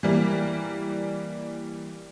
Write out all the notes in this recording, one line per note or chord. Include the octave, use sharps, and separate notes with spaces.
E3 G3 A#3